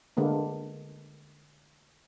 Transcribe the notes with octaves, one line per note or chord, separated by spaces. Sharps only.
D3 G#3 A#3 B3